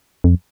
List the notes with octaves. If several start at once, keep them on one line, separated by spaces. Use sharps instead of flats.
F2